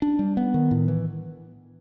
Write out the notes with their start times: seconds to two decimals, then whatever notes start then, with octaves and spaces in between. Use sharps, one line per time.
0.02 D4
0.19 G3
0.37 B3
0.54 D#3
0.71 A2
0.88 E3